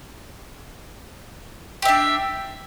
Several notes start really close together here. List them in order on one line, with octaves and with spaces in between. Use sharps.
G4 E5 D4